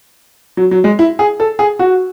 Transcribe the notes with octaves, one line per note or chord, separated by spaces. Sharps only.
F#3
F#3
G#3
E4
G#4
A4
G#4
F#4